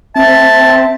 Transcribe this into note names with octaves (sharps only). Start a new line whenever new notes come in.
C4 E5 A5